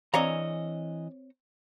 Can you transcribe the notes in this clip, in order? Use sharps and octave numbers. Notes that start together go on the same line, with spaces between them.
E3 C4 D4 G#4 C#5 D#5 F5 A#5